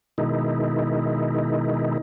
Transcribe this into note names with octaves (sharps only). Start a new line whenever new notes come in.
B2 D#3 G#3 D#4 E4